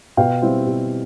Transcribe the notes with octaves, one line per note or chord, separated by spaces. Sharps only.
B2 F5 G5
G3 C4 E4
B2